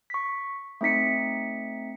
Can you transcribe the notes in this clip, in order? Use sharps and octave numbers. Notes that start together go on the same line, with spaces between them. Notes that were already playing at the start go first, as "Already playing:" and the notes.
C#6 B6
A3 C4 D#4 B6 C#7